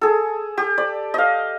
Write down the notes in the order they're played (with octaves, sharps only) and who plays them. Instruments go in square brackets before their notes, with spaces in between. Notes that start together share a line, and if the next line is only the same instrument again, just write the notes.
[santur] G#4 A4
G4
D5
D#5 F5